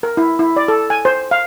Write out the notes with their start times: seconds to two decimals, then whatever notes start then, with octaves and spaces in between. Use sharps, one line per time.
0.03 A#4
0.17 E4
0.39 E4
0.57 D5
0.68 A4
0.90 G#5
1.05 C5
1.31 F5